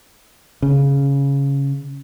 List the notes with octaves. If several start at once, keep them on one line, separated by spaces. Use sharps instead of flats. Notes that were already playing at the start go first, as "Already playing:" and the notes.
C#3